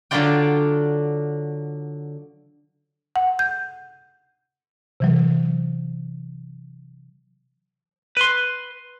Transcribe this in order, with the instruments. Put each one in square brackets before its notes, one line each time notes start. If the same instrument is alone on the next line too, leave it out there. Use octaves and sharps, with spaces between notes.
[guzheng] D3 F#3 D4 F4 D5 G5
[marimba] F#5
G6
C3 E3 F#3
[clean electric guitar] B4 C6